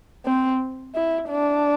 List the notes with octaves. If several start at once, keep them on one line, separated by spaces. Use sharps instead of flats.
C4
E4
D4